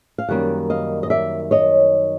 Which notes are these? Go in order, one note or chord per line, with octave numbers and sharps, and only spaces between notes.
F5
F#2 D#3 G3 A#3 F#5
D#5 F5
D#5
D5 E5
C#5 D#5